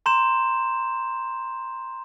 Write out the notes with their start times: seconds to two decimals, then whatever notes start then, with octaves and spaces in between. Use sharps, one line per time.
0.06 A#5 C6 G6 E7